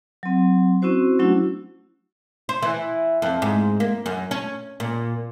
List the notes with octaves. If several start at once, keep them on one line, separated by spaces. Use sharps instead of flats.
F#3 C4
C4 C#4 E4 F#4 C5
F#3 A3 C#4 D4 E4 F#4
C5
E3
F2
G#2
A#3
F#2
C#4
A#2